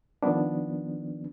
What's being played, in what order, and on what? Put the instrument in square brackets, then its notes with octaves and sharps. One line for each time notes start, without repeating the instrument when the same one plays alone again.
[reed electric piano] D#3 F3 A#3 B3 D4